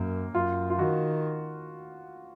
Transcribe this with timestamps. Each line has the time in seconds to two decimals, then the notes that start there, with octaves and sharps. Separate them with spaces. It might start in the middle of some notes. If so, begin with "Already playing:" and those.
Already playing: F#2 A#3
0.34 F#2 F4
0.70 F4
0.79 D#3 F#4